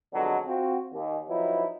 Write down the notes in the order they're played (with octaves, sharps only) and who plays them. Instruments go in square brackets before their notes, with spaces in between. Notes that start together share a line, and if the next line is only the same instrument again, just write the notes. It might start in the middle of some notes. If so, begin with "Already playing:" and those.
[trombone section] F2 B2 D3 F#3 G#3
C4 F4 F#4
D#2
F3 F#3 B3 D#4 E4